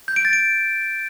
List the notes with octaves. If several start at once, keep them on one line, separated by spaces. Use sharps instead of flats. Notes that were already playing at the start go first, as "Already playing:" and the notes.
G6
D7
A6
D7